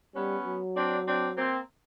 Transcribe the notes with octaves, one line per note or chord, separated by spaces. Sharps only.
G3 B3 C#4
F#3
C4 D4
C4 D4
A#3 C4